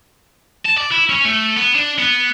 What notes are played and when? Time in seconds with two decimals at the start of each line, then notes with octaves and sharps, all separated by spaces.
0.65 A5
0.77 D5
0.92 E4
1.10 C#4
1.25 A3
1.57 B3
1.75 D4
1.99 B3